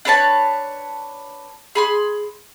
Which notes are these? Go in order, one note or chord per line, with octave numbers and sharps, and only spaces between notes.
D4 B4 C#5 A5
G#4 B5 C6